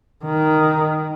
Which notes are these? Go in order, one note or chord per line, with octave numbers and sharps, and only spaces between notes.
D#3